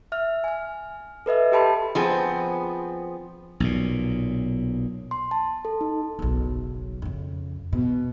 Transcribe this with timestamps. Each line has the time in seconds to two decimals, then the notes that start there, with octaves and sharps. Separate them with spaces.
0.12 E5 F6
0.44 G#5 F6
1.26 A4 B4 D#5 E5
1.52 G4 A4 G5 A5 B5 C6
1.95 F3 B3 C4 G#4
3.60 B1 A#2
5.11 C6
5.31 A5
5.65 A4
5.81 D#4
6.19 F#1 B1
7.02 F2 C#3
7.73 B2